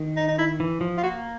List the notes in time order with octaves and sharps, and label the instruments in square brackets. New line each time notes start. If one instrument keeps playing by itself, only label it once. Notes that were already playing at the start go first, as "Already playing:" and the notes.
Already playing: [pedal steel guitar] D#3
[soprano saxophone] D#4
D#4
E4
[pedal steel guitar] E3
F3
[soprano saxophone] F4
[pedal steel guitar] A#3 [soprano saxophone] F#4